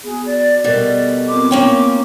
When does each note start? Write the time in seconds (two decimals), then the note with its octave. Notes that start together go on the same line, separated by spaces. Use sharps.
0.04 B3 F#4 G#4
0.26 D5
0.64 B2 G3 A4 A#4 D5 D#5
1.28 B3 C4 F4 D6
1.51 A#3 C#4 G5